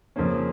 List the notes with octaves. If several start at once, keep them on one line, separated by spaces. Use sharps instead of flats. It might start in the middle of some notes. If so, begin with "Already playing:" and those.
F2 C#3 F3 A#3 C#4